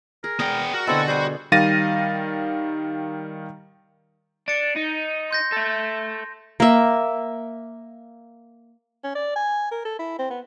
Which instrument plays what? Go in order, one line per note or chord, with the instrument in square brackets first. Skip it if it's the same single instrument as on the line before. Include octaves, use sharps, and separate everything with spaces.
[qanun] G#4 [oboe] A#4
[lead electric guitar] B3 G5 [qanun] G#4 D5 A#5
[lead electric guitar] F#4 [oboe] A#4
[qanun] B2 D3 G#5 [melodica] C4 E4 E5 [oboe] A4
[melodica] G3 [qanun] G#4 A4 G#5 [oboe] C5
[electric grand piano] D#3 G3 F5 A6 A#6 D#7
[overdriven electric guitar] D4 [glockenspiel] A6 C7 C#7
[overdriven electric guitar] D#4
[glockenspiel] C6 G6 A#6
[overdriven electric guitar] A4 E5
[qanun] A#3 E5
[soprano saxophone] C#4
D5
G#5
A#4
A4
E4
C4
B3